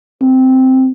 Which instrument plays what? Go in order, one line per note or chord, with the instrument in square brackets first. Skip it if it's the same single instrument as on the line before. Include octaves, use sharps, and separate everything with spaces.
[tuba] C4